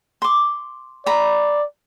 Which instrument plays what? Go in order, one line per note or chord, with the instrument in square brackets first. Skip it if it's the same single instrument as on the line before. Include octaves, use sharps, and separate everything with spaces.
[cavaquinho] C6 D6
[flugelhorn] D5 [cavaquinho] A#5 B5